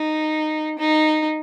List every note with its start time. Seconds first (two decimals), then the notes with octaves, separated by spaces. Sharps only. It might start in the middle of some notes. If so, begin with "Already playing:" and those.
Already playing: D#4
0.79 D#4